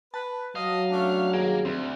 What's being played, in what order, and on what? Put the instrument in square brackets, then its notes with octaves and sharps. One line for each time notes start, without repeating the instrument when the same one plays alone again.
[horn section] B4 [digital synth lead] A5
[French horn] F#3 [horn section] D#5 [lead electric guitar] F5
[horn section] A3 C#4 D4
[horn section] G2 D#3 [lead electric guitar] A#3 [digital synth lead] G#4
[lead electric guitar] D2 [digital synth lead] C4